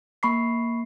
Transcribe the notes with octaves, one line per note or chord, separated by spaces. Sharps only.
A#3 B5 C#6 C7